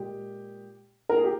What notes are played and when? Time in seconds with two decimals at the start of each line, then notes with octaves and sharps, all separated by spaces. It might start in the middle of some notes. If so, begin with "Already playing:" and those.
Already playing: A#2 G#3 G4
1.09 A#4
1.17 G#4
1.24 G4